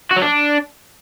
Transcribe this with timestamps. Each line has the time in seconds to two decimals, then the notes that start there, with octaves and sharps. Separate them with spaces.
0.11 F#4
0.16 F#3
0.22 D4